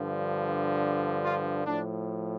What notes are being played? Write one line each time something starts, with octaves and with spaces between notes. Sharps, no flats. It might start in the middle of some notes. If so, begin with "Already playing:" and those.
Already playing: G2 D3 F3
F4
A2 F3 D4